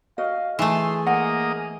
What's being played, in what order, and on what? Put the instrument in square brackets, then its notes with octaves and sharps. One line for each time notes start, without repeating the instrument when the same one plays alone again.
[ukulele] F#4 D#5 [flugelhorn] F5
[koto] E3 A3 [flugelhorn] G#4 [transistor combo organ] C6
[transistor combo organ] A#3 D#5 [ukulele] F#5